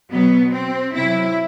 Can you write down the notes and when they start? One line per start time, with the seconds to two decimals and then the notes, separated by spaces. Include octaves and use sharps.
0.12 B2 F#3 B3
0.54 C4
0.96 C3 F#3 E4